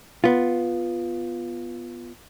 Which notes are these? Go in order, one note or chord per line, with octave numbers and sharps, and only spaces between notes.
B3 F4